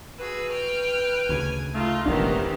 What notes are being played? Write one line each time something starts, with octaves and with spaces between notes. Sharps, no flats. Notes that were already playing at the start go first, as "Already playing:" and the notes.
F#4 G#4 B4 E6
G5 F6
D2 C#3 G#5
A3 D#4 F4
E1 A1 C3 D#3 E3 B3 D4